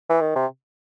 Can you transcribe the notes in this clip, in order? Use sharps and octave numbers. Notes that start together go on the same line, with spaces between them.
E3
D#3
C3